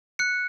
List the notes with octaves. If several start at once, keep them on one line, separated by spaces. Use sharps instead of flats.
F#6 C#7